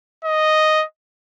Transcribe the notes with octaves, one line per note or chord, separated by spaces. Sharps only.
D#5